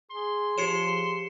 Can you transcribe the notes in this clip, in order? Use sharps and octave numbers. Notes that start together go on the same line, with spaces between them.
G#4 C6
F3 G4 G#4 C#5 C7 C#7 E7